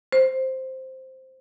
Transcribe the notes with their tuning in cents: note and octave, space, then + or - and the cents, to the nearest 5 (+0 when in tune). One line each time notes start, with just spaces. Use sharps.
C5 +0